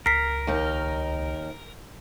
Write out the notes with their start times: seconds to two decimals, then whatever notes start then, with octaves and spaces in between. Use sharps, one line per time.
0.06 C#2 A#4 B6 C7
0.47 D#2 D#4